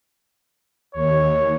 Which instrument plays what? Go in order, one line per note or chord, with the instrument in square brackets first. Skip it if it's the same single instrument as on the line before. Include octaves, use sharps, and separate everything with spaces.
[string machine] D#2 [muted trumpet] C#5